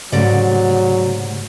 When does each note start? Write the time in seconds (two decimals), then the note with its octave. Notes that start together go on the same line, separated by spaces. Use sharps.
0.12 G#2 C#3 F#3 G3 A3 D5